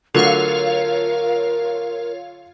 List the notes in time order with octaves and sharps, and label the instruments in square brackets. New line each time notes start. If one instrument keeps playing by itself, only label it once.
[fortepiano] D3 F#3 A3 [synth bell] F4 C#5 F5 [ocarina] A#4